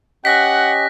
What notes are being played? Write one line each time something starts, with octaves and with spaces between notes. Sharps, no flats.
C#4 G4 D#5 F#5 F#6 A#6 B6